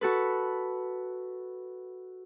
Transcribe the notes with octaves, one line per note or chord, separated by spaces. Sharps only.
F#4 A4 B4